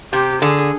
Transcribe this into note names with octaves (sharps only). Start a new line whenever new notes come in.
C3 G4
D3 G#4